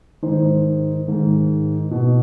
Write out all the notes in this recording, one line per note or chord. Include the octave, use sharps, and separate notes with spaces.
G#2 D#3 C5
G#2 D#3
B2